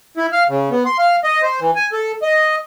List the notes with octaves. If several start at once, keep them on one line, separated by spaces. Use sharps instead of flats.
E4
F5
C#3
B3
C6
F5
D#5
C5
E3
G#5
A4
D#5